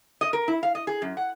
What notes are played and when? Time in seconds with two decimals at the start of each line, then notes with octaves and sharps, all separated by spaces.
0.21 D#5
0.33 A#4
0.48 E4
0.63 F5
0.75 D#5
0.87 G#4
1.02 F#2
1.17 F#5